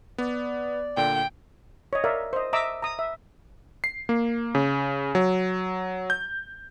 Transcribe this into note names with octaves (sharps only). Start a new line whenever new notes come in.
B3 D5
A#2 D3 G5
C#5 D#5
A#4 D5 E5 F5
C5 D#5
D#5 E5 A#5 D6 E6
A#5 D#6
E5
C7
A#3
C#3
F#3
G6